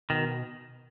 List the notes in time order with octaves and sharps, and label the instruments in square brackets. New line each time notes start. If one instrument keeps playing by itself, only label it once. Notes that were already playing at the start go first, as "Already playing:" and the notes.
[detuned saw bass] B2 [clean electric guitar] D#3